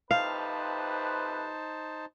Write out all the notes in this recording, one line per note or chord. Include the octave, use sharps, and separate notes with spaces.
F2 C3 D#4 B4 C5 F5 A5